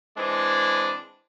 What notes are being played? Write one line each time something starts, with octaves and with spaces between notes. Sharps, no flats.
E3 G#3 C4 D4